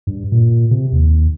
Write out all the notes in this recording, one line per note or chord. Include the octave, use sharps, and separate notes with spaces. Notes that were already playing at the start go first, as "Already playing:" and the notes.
G2
A#2
C3
D#2